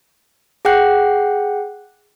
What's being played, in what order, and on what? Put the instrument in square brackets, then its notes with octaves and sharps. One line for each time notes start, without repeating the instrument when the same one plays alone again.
[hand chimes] G#4 F#5 G5 F#6